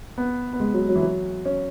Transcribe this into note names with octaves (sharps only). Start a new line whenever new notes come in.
B3
B3
G#3
F#3
F#3
E3
F#3
C#4